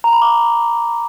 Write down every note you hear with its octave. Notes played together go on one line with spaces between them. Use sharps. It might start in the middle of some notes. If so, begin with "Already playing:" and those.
A#5
B5
D6